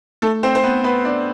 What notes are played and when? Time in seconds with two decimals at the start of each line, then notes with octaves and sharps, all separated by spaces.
0.22 A3 A4
0.43 C4 C5
0.55 C5
0.63 B3 B4
0.84 B3 B4
1.05 D4